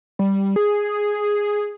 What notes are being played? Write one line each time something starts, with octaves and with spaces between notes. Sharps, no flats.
G3
G#4